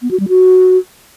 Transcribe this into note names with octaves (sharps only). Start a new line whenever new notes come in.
B3
F#4
G3
F#4